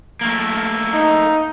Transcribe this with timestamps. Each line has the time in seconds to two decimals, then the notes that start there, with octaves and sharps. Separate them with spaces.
0.21 A3 A#3
0.93 D#4